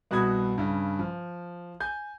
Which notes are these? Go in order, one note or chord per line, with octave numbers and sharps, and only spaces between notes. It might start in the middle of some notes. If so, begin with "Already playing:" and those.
C2 B2 F#4 B5 D#6 G#6
G2 C#3
F3
G#5 G6